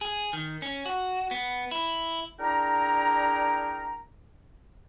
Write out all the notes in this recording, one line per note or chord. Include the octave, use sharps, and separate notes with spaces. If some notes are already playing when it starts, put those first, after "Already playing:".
G#4
D#3
C#4
F#4
B3
E4
D4 E4 G#4 A#4 G5 A#5